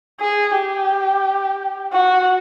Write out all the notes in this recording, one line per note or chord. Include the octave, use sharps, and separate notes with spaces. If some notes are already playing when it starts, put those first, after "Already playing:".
G#4
G4
F#4